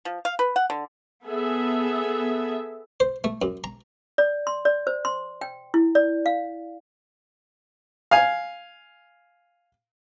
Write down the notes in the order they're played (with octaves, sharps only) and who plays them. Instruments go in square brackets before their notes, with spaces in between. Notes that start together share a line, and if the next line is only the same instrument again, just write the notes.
[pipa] F3
F5
B4
F#5
D3
[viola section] B3 G#4 A4 E5
[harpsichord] C5
A3
F#2
A#5
[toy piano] D5
C6
D5
C5
C6
G5
E4
D5
F5
[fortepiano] F5 G#5